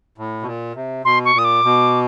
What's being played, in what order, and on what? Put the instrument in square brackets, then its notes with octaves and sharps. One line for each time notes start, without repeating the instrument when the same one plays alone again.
[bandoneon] A2
B2
A#2
C3
[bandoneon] B2 [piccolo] C6
[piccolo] C#6
[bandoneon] A#2 [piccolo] D#6
[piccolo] D6
[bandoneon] B2